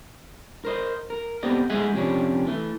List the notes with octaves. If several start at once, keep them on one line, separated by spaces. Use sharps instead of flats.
A#4 C5 D#5
A#4
B3 C4 G4 A4 D5 D#5
G#3 A3 G#4 D#5 E5 F#5
F2 C3 A#3 C#4 D4
E3 A3